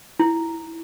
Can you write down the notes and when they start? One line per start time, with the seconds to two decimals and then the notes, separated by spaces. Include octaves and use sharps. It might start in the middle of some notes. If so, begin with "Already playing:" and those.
0.20 E4